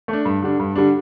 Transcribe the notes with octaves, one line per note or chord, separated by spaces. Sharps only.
A3
D4
G2
D3 G3 D4
G2
D3 G3 D4